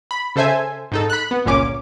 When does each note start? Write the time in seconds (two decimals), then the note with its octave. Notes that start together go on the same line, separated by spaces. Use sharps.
0.11 B5
0.36 C#3 A4 C5 E5 G#5
0.92 G#2 D#4 A4
1.10 B5 F#6
1.31 B3
1.46 G1 C#2 A#2 C#4 D6